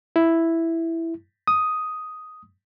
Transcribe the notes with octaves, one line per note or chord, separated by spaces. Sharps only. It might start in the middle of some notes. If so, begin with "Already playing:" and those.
E4
D#6